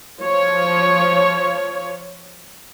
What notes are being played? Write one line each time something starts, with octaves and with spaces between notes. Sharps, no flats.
F3 C#5